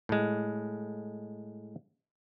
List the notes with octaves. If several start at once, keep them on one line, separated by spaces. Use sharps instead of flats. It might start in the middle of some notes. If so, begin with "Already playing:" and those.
A2 G#3